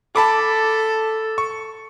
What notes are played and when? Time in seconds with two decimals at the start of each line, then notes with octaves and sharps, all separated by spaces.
0.16 A4 A5 B5 D6
1.38 C#6